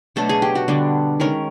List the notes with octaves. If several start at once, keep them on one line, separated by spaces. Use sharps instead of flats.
B2 F#3 A3 D4 A4
G#4
G4
F#4
D3 G3 B3 D4
D#3 G#3 C#4 A#4